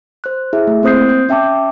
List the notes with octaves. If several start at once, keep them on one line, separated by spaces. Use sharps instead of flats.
C5 F#6
E4 G#4 E5
A3 E4
A#3 C4 C5 D#6 G6 C7
G6
C#4 E5 G5 A5 D6